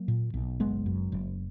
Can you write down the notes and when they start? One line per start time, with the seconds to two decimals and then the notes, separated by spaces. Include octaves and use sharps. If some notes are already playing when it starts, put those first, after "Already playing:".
Already playing: F#3 A#3
0.08 A#2
0.34 B1
0.60 F#1 G#3 B3
0.86 F#2
1.12 F#1